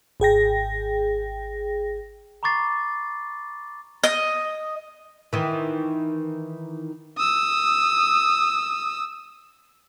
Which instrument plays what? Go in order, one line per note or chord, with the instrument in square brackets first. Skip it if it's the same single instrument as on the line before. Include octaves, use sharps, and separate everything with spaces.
[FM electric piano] G#1 G#4 G5 A#6
[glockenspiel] A#5 B5 C#6 D6 A6 C7
[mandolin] D#5
[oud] D#3 E3
[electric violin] D#6 E6